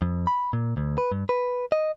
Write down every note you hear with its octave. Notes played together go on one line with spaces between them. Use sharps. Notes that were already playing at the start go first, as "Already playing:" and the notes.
F2
B5
A#2
D2
B4
G2
B4
D#5